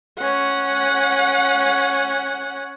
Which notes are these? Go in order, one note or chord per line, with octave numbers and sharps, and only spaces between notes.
C#4 F#5